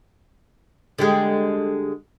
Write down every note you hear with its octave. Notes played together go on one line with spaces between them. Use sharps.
D3 G3 G#3